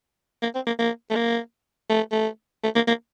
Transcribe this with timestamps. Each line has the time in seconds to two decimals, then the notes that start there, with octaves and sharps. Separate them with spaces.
0.43 A#3
0.55 C4
0.67 A#3
0.79 A#3
1.11 A3
1.16 A#3
1.90 A3
2.12 A3
2.64 A3
2.75 A#3
2.88 A#3